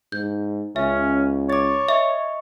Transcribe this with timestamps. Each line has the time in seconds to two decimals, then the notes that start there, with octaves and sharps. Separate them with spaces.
0.12 G#2 G6
0.76 C#2 C#4 E5
1.50 C#5 D6 A6
1.89 D#5 E5 C#6